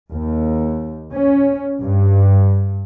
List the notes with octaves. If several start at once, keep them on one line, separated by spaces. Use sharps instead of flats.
D#2
C#4
G2